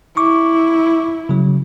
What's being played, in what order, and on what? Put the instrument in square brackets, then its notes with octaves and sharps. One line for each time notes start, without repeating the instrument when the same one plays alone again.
[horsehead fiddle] E4 [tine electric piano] C#6 D6
[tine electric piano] C#3 F#3